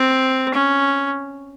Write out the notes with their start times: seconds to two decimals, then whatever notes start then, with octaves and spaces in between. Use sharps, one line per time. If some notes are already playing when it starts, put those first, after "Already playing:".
Already playing: C4
0.54 C#4